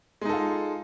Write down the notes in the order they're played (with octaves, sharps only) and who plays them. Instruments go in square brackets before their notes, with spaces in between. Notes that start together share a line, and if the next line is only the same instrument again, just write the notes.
[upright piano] G#3
D#4
A4
F4